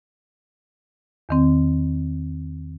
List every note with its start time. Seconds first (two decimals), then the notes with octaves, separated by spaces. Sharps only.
1.29 E2 D#3 C4